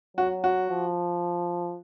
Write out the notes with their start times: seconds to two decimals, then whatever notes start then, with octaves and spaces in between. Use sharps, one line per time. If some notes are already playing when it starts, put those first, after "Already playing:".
0.17 F#3 F#4
0.44 F#4
0.70 F3